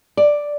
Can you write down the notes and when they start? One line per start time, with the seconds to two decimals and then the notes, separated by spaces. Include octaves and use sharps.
0.17 D5